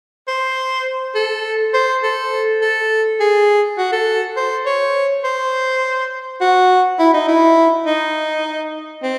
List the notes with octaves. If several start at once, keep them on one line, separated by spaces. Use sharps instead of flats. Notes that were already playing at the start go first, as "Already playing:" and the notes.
C5
A4
C5
A4
A4
G#4
F#4
A4
C5
C#5
C5
F#4
E4
D#4
E4
D#4
C4